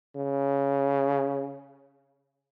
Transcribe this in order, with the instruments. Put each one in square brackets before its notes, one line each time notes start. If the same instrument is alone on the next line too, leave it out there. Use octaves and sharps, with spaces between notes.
[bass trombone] C#3